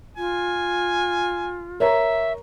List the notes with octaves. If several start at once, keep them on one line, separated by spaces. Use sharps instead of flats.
F4 G#5
A#4 C#5 E5 A#5